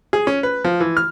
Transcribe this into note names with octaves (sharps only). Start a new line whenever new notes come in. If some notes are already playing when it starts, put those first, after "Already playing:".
G#4
C#4
B4
F3
E3
F6